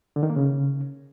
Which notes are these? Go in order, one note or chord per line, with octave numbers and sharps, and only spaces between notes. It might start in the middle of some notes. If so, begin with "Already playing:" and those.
D3
D#3
A#3
C#3